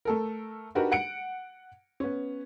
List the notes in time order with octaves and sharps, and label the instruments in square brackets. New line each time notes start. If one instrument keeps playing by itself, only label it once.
[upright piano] A3 A4 A#4
D4 D#4 F#4 G4 A#4 B4
F#5 C#7 D7
B3 C#4